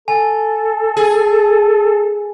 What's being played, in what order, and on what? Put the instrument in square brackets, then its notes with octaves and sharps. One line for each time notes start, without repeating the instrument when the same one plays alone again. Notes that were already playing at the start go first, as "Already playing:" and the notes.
[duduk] A4 [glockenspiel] G#5
[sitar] G#4